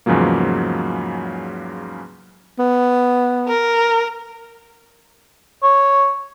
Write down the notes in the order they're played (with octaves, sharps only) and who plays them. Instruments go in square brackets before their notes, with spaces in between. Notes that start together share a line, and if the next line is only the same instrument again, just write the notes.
[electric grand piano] E2 G#2 C#3 F3 F#3 A#3
[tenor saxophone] B3
[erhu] A#4
[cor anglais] C#5